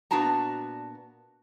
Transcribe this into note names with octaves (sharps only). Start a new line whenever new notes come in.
A#2 B3 D4 F#4 A5 A#5